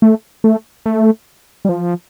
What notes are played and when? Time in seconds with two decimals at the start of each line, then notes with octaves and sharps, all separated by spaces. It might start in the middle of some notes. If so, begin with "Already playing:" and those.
0.02 A3
0.44 A3
0.86 A3
1.65 G3
1.69 F3